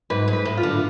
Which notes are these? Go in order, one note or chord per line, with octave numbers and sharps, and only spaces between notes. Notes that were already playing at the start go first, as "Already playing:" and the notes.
G#2 B4
G#2
B4
A2
F4
D3